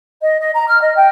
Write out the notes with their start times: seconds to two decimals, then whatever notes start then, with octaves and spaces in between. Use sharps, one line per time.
0.21 D#5
0.41 D#5
0.54 A#5
0.66 F6
0.81 D#5
0.95 G5